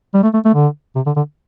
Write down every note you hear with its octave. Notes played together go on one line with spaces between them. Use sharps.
G3
A3
A3
A3
D3
C3
D3
D3